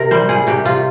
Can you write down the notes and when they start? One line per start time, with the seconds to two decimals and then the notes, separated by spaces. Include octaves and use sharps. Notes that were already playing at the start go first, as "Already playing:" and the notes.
Already playing: C3 A#4
0.11 G3 C5
0.29 G3 G#4
0.47 C3 G4
0.65 C3 F4